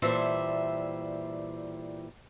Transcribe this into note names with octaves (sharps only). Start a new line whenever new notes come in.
A#2 E3 G3 C5 E5 A5